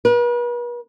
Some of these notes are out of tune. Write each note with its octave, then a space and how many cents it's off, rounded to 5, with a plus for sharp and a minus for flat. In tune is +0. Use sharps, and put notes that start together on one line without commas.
B4 -45